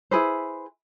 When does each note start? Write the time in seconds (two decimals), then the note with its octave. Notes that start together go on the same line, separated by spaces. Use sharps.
0.11 E4 G#4 B4 C5